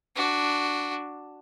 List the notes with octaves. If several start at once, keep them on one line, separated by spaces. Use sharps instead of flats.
D4 F#4